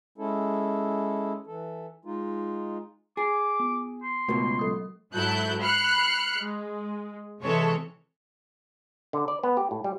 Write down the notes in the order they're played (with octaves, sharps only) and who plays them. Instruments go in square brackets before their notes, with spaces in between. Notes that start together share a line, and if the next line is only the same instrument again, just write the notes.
[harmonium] G#3 C#4 E4 A4
E3 A4
G#3 D#4 F4
[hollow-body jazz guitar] G#4 [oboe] D6
[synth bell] B3
[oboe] C6
[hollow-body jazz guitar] C#2 B2 [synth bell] A3 F#4 A#4
[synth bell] F#3 A4 D#6
[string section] G#2 F#3 E4 A4 F#6 G6
B5 F6 F#6 C7 C#7
G#3
C3 E3 G#3 A4 C#5
[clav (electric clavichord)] D3
D5
B3
G4
A2
G3